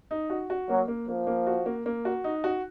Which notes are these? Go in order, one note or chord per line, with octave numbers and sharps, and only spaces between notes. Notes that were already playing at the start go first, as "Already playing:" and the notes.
D#4
F#4
F#4
F#3 A#3
A#3
F3 A#3
A#3
F#4
A#3
A#3
F#4
D#4
F#4